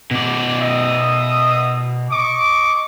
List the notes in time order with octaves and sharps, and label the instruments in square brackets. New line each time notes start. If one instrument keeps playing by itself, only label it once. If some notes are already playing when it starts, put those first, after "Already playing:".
[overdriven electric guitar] B2 D5
[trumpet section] D#5 E5 D#6
D#5 C#6 D6